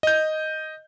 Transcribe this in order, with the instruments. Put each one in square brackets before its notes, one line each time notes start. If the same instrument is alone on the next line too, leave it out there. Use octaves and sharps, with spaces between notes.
[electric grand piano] D#5 G6